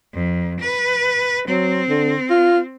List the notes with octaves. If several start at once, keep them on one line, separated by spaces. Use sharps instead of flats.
F2
B4
F#3 C4
D3
F4